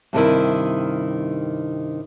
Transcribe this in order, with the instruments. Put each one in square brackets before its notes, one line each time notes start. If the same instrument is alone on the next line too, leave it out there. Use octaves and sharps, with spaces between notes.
[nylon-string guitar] G2 C3 D#3 E4